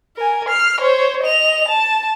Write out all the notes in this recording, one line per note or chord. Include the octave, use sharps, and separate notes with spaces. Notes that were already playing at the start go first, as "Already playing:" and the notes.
A#4 G#5
F6 C7
C5 C#5
D#5 F7
A5